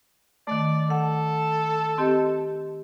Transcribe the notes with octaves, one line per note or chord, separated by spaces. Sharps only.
D#3 A3 D5
A4 F#5
C4 G4 D#5